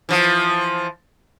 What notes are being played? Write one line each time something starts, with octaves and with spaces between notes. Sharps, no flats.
E3 F3